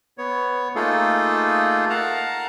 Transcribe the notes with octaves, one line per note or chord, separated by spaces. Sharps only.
B3 C#5
A3 A#3 D#4 F4 G#4 A4
A#4 F5 F#5 A5 A#5